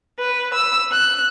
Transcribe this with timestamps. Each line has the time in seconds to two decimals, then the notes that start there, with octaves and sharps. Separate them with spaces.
0.19 B4
0.54 E6
0.92 F#6